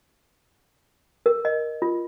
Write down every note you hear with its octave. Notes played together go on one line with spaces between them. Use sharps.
A#4
D#5
F4